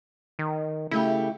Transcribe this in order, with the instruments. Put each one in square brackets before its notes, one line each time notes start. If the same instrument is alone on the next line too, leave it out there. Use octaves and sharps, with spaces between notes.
[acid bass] D#3
[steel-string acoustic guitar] C#3 A3 G4 [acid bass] E4